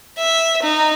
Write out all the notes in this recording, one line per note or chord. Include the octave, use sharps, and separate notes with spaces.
E5
D#4